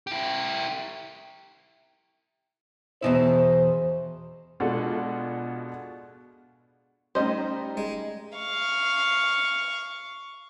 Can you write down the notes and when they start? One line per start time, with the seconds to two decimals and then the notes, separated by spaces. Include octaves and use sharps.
0.07 E4 G4
3.02 E2 B2 E4 C5
4.60 B2 G#3 D4 F4 F#4 A4
7.15 G3 A3 C#4 D#4 C5 D#5 C6
7.77 G#3
8.38 F5 C#6